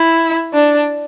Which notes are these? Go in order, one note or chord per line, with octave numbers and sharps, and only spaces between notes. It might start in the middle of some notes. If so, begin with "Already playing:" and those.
Already playing: E4
D4